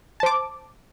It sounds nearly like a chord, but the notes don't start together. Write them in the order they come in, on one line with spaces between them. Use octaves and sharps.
A5 C5 D6